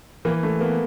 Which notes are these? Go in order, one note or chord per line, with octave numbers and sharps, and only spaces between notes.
E3 A#3
A3
A#3 B3